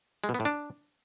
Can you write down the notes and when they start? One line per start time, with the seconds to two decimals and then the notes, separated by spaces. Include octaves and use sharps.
0.24 G#3
0.29 B2
0.34 B3
0.40 A2
0.45 D4